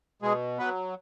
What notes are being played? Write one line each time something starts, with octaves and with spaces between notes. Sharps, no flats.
B2 G#3 G#4
F#3 B3 B4